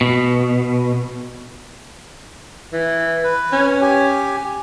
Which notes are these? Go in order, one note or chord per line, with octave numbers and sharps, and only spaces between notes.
B2
E3
B4
C#4
G4 G#5